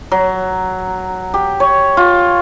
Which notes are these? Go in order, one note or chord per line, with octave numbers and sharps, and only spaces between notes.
F#3
G4
C#5
F4